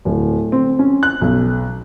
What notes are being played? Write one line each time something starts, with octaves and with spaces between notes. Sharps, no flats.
D1
C4
C#4
F#6
B1